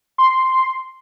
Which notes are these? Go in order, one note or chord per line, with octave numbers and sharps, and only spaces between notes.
C6